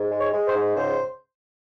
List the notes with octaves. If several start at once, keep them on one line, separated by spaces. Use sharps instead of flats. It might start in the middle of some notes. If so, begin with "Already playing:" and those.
Already playing: G#2
G#3
C#5
G#3
C5
G#2
C#2 C5